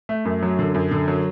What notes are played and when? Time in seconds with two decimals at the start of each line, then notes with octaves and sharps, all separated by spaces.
0.09 A3
0.25 F#2
0.43 F#3
0.59 D3
0.74 F#2
0.91 D3
1.08 F#3